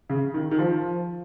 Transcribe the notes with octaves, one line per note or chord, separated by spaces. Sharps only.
C#3
D#3
D#3
F3